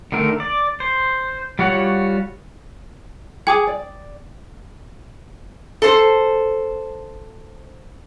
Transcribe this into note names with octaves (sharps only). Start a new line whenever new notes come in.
D3 D#3 A3 A#4
D5
C5
G3 F4 F#4 C#5 F#5
G#4 G5 D6 D#6
D5
A4 C5